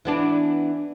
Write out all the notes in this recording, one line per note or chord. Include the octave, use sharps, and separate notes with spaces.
E3 B3 D4